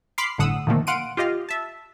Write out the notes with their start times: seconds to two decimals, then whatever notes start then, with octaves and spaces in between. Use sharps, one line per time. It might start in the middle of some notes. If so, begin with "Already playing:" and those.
0.18 B5 C6 D6 F6 C7
0.38 G1 A2 D3 F#5 D#6 E6
0.67 A#2 D3 D#3 F3 A3 A#3
0.87 F5 F#5 C6 D7 D#7
1.17 F4 G4 D#5 F5
1.49 E5 A5